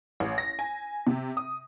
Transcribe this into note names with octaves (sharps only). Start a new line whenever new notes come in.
A1
A#6
G#5
C3
D#6